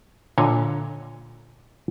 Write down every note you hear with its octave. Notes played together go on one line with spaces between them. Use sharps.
A#2 D3 C#5 D#5 G#5